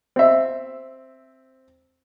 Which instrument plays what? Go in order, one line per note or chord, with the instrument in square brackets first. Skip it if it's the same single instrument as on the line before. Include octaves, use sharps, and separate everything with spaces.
[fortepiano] C4 E5